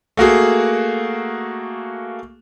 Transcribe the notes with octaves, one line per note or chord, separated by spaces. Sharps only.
A3 A#3 F#4 G#4